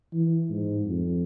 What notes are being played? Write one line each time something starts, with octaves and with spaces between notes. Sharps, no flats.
E3
G#2
F2